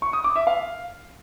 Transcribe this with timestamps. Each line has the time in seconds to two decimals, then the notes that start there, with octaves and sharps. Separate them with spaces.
0.02 C#6
0.13 D#6
0.24 D6
0.36 E5
0.47 F5